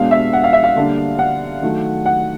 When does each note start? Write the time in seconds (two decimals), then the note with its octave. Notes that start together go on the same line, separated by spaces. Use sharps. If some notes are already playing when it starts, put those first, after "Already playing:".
Already playing: B2 G#3 B3 D4 F5
0.11 E5
0.33 F#5
0.44 F5
0.53 E5
0.64 F5
0.76 D3 G3 A#3 D4
1.19 F#5
1.62 D#3 F#3 A3
2.06 F#5